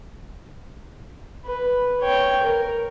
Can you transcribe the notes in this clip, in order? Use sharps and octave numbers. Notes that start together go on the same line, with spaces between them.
B4
C#5 G5
A#4